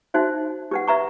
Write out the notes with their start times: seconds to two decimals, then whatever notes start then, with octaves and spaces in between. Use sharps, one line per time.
0.14 D#4 F#4 C5 E5
0.71 G4 B4 F#5
0.87 B4 E5 A#5 C#6